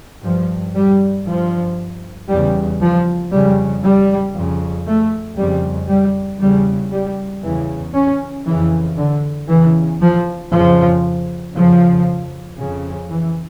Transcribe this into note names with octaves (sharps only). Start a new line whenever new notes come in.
G2 F3
G3
G2 F3
E2 C#3 G3
F3
F2 C#3 G3
G3
F2 C#3
A3
F2 C#3 G3
G3
E2 C#3 G3
G3
E2 C#3 E3
C#4
F2 C#3 E3
D3
E2 C#3 E3
F3
F2 C#3 F3
F2 C#3 F3
F2 C#3
E3